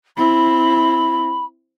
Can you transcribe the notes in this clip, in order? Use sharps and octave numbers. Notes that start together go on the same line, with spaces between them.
C4 E4 B5